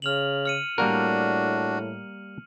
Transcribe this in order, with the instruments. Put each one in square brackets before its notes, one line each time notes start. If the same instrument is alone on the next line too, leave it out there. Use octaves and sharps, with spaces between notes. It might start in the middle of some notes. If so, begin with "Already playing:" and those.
[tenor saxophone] C#3 [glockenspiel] F6 F7 F#7
[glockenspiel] F6 C#7 D#7
[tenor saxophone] A2 [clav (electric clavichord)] G3 A#3 A#4 [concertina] D4 F#4